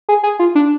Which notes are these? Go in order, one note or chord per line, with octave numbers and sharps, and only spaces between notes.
G#4
G#4
F4
D4